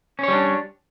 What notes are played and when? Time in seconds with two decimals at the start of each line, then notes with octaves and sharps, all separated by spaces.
0.19 C#4
0.23 C#5
0.28 G3
0.33 D4